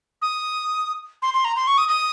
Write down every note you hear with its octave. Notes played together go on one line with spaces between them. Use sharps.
D#6
C6
C6
A#5
C6
C#6
D#6
D#6